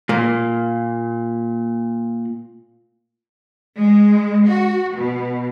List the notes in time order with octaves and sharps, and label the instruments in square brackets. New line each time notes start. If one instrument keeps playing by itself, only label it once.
[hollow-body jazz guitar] A#2 A#3
[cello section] G#3
F#4
B2